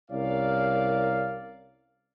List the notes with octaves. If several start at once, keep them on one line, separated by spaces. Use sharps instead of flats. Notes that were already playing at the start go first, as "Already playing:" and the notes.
C2 C#4 A#4 D5 F5